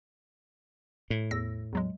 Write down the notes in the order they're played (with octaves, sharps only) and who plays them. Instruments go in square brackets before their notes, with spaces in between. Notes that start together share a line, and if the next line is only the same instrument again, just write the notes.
[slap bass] A2
[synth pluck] E2 E6 A#6
E2 F#3 G#3